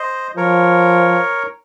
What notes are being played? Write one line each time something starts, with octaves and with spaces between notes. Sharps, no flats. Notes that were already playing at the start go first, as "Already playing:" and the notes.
Already playing: C5 D#5
F3 A#4 C#5